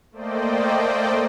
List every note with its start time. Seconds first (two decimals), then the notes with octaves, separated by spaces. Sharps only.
0.12 A3 A#3 C5 D5 D#5 G5